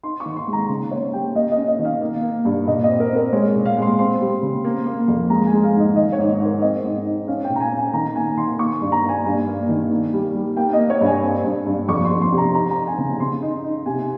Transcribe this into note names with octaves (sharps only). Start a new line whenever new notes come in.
D#4 C6
C#6
D#3
C6
G#3
A#5
C#3
A#3 C#5
G3 G5
A#3 D#5
D#5
C#4
D#5
D#3
F5
A#3
A#3
G2
A#2 D#5
D#5
C4
A#4
C4
A#4
G#3 C#5
A#2
F5
G#3
C6
C4 C6
G3
C#3
A#3
A#3
F2
G#3 A#5
G#5
G#3
F5
G#2 D#5
D#3 D#5
C#5
G#2
G#2
A#4
C4 D#5
G#2
D#4
C#4 F5
A#2 G5
A#5
G#5
C#4
G#5
D#3 A#5
A#3 G#5
D#3 C6
A#3 C#6
G2
A#5
A#3
G#5
G2
A#3
D#3
A#3
G3
G3
A#3 G5
D#5
A#3
C#5
G2
G#5
C4
G2
G2
F2 C#6
C6
F2
C6
C3
A#5
D#4 A#5
A#5
D#4
G#5
C#3
C#3 C6
D#4
D#4
C3 G#5